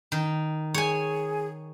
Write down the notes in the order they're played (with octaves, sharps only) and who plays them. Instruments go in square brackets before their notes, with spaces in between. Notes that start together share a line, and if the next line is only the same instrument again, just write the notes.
[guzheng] D#3
[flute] G#4 [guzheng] C#5 G#5